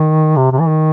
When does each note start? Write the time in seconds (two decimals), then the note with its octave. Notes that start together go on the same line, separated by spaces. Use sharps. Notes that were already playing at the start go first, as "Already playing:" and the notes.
Already playing: D#3
0.36 C3
0.52 C3
0.60 E3
0.68 D#3